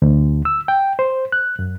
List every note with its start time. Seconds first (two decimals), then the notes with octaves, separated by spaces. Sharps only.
0.02 D2
0.45 E6
0.68 G5
0.99 C5
1.32 F#6
1.59 F#2